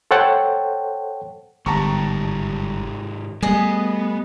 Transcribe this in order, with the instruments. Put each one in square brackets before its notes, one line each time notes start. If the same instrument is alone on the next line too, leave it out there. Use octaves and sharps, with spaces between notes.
[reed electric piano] A4 C5 C#5 F#5 G5 A5
[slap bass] G1 [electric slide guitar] G#2 D#3 G4 [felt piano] A5 A#5 C#6
[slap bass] G3 A3 [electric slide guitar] B3 [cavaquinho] G#4 D#5